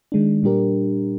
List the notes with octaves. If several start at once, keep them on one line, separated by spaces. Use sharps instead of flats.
D#3 G#3 D4
A#2 G3 D4 G4 A#4